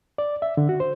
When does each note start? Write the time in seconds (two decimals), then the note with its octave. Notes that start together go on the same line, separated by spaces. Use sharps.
0.18 D5
0.42 E5
0.57 D3
0.69 F#4
0.80 C5